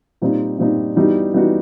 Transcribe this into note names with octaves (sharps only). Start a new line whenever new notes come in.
A#2 G3 C4 D#4
A#2 G3 C4 D#4
E3 G3 B3 D#4 F#4
E3 G3 B3 D#4 F#4